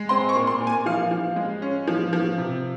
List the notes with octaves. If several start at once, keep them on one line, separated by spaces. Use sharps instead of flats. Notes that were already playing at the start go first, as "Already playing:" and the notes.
Already playing: G#3
C4 C6
C#6
A#2
C6
A#2
G#5
F3 F5
F3
G#3
C#4
F3
F3
C3